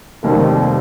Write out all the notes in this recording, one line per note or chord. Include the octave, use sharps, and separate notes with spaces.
F1 D#2 D#3 G3 C4